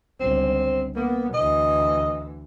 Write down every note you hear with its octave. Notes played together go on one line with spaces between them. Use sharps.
G1 C#2 C4
A#3 B3
D2 E3 D#5